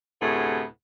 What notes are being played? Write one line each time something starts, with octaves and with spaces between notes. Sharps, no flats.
D2 A2 C3 B3 G#4